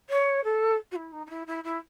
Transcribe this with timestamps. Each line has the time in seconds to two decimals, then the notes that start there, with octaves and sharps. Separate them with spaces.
0.09 C#5
0.44 A4
0.91 F#4
0.96 E4
1.12 D#4
1.26 D#4
1.30 E4
1.47 E4
1.64 E4